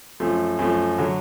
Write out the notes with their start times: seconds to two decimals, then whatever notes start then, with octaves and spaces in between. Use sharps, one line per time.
0.20 F#2 F3 A3
0.59 F#2 F3 A3
0.98 D3 F#3